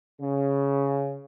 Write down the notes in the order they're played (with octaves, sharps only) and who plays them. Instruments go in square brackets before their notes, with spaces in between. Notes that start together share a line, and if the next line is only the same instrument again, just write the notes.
[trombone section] C#3